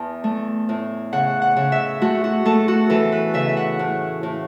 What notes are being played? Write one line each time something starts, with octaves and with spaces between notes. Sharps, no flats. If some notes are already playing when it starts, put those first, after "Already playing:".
Already playing: E2 A5
A3
A2
C#3 F#5
F#5
C#3
E5
A3 F#4
F#4
A3 A4
F#4
E3 A4
B4
C#3 E5
E5
F#5
A2
A2